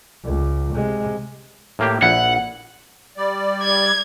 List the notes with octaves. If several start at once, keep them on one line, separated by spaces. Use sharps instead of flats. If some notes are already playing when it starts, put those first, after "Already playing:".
C#2
C3 G#3
A2 A#3 G4
A#1 E4 F#5
G3 D5
G#6